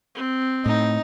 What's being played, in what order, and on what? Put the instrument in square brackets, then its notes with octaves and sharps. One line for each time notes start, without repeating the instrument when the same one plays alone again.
[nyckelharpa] C4
[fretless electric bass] A2 [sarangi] D#4